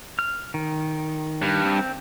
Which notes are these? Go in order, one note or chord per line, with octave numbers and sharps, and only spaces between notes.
F6
D#3
G2
C4